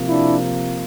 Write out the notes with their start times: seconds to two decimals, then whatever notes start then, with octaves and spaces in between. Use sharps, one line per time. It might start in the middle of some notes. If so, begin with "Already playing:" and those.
Already playing: C3 F3 A#3
0.08 D4 E4